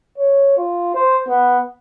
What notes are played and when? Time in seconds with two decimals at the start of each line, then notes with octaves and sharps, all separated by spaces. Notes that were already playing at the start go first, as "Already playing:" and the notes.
0.18 C#5
0.57 F4
0.95 C5
1.28 B3